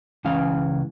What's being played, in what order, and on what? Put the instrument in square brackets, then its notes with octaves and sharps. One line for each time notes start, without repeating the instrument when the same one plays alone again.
[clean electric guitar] C#2 C#3 E3 F5